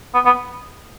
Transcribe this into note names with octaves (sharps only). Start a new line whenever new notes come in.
B3
B3